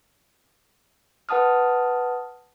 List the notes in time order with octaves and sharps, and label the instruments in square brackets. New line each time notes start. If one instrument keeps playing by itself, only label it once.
[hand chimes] B4 F#5 A5 D#6 F6